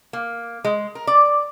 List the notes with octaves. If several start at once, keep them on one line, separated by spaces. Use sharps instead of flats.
A#3
G#3
A#4
D5